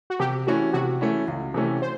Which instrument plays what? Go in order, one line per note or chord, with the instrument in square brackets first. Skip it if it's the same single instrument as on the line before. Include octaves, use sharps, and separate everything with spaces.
[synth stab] F#4
[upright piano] C3 [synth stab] G4
[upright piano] E3 A3 C#4 E4 [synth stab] F#4
[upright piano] C3 [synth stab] F#4
[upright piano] E3 A3 C#4 E4
C#2
C3 E3 A3 C#4
[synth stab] C5